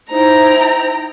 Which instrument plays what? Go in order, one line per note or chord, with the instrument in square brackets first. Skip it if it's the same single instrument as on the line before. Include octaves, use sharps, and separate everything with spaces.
[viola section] D#4 E4 G5 [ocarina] C5 [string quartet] A#5